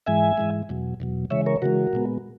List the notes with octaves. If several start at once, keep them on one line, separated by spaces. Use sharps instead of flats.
G#2 E3 G#3 E5 G#5
G#2 E3 G#3
E2 B2 F#3
E2 B2 F#3
C#3 E3 G#3 C#5 E5
A#4 C#5
C#3 E3 G#3 F#4 A#4
A#2 G#3 B3